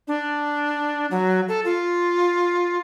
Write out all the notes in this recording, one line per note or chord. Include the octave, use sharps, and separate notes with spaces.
D4
F#3
A4
F4